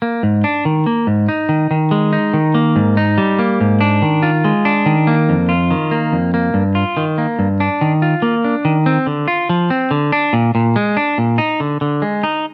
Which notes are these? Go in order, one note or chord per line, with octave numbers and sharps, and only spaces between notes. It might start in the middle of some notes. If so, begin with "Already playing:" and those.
A#3
G#2
D4
D#3
A#3
G#2
D#4
D#3
D#3
G#3
D#4
D#3
A#3
G#2
D#4
G3
A#3
G#2
D4
D#3
F4
G#3
D4
D#3
A#3
F2
F4
D#3
A#3
F2
A#3
G2
F4
D#3
A#3
G2
D4
D#3
F4
A#3
D4
D#3
C4
D3
F4
F3
C4
D3
D4
A#2
A#2
G#3
D4
A#2
D#4
D3
D3
G#3
D#4